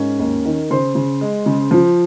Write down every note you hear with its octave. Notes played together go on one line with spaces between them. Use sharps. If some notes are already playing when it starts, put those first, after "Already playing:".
Already playing: G#2 C#4 A#4
D#2
D#3
C#3 C5 C6
C#3
G#3
C#3
F3